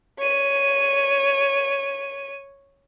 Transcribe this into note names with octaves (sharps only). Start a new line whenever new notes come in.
C#5 D#7